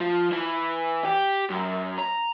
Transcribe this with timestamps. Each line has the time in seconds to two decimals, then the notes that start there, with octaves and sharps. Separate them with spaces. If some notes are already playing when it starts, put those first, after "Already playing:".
0.01 F3
0.32 E3
1.05 G4
1.50 F#2
1.99 A#5